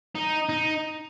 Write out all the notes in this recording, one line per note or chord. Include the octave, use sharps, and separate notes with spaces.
D#4
D#4